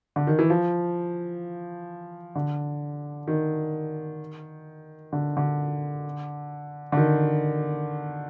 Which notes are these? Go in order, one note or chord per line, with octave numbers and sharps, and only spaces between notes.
D3
D#3
E3
F3
D3
D#3
D3
D3
D3
D#3